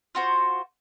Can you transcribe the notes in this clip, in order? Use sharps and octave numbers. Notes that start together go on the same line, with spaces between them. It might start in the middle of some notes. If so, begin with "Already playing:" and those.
F4 F#4 C5